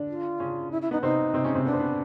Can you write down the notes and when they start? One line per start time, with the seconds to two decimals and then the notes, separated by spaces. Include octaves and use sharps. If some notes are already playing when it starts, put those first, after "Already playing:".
Already playing: D3 D4
0.08 F4
0.40 C#3 C#4
0.71 E4
0.82 E4
0.91 B3 D#4
1.02 C3 C4 D#4
1.33 C3 C4
1.44 C#3 C#4
1.54 C3 C4
1.65 B3 D4
1.73 C4
1.80 B3